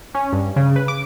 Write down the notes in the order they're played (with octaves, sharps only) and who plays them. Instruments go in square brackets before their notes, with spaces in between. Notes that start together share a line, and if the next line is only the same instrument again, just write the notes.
[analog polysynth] C#4
G2
C#3
B4
D6